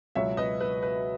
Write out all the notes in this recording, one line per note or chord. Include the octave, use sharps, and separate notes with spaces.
C#2 B2 F#3 C#5 E5
B4 D#5
B4
B4